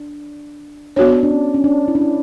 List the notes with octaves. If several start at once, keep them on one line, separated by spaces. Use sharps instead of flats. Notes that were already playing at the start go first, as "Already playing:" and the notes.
Already playing: D4
B3 D4 F#4 C#5
D4
C#4
C#4
D4
E4
D4
E4